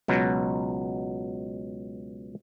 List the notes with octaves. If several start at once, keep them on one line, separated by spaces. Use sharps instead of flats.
C#2 B2 F#3